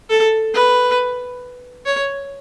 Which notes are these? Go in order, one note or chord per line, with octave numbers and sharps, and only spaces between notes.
A4
B4
C#5